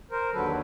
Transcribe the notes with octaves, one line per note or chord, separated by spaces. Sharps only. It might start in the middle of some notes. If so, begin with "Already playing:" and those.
A#4 C5
D#2 D3 F#3 A4 B4